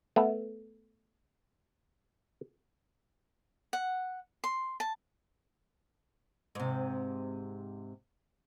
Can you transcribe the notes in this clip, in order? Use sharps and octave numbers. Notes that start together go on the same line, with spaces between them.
A3 B3
F#5
C6
A5
G#2 C3